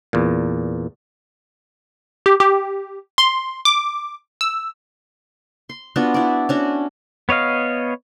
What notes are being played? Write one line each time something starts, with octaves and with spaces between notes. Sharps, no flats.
E2 A#2
G4
G4
C6
D6
E6
C6
B3 D4 F4 F#4
E4 D5
C#4 D4 F#4
B3 C#5 D#5 F5